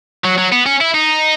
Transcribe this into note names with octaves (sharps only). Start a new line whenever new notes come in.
F#3
F#3
B3
C#4
E4
D#4